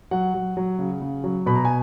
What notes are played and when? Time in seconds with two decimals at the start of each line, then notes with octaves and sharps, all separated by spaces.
0.11 F#3 F#5
0.34 F#3
0.57 F#3
0.79 C#3
1.01 C#3
1.24 F#3
1.46 B2 B5
1.56 A#5
1.65 G#5